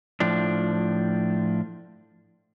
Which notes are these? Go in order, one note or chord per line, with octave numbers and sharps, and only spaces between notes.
A2 F3 D4